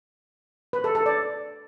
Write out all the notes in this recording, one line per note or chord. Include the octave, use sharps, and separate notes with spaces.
B4
A4
A4
D5